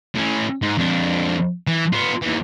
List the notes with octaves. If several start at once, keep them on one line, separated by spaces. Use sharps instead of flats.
A2 C#4
G#2
F2 D4
E3
B3 F4
D#2 E3